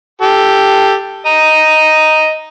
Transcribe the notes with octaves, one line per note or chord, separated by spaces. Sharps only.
G4 A4
D#5 A#5